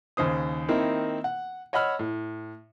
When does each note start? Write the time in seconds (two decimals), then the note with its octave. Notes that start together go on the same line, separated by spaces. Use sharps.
0.17 D#2 C#3 C5 D#6
0.68 D#3 A#3 C4 D#4 E4
1.24 F#5
1.73 C#5 D#5 F#5 B5 E6 F6
1.99 A2